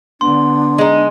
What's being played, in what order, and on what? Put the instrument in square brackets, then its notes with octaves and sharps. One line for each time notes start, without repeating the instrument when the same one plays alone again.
[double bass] D3 B3 [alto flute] D4 [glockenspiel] C6
[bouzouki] G#3 D#4